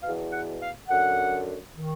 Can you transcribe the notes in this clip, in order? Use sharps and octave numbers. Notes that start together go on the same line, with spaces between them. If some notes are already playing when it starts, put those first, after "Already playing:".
E2 B2 F5
F#5
F5
F#2 D3 F#5
D#3